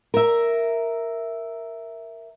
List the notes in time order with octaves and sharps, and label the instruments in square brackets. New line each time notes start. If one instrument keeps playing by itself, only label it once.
[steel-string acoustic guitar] A#4 E5